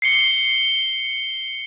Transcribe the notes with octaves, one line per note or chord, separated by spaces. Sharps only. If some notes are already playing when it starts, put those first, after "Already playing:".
C7 C#7 G7